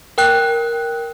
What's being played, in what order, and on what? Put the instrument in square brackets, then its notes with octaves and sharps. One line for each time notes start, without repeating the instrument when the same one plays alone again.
[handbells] A#4 G5 F#6